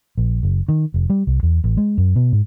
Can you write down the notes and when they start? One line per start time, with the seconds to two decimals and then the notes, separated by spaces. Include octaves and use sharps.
0.18 A#1
0.43 F#1
0.69 D#3
0.94 F1
1.10 G3
1.27 C2
1.43 E2
1.64 A1
1.77 G#3
1.98 F#2
2.16 B2
2.32 G#2